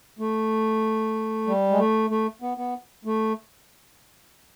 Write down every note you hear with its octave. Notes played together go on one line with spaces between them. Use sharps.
A3
G3
G#3
A3
A3
B3
B3
A3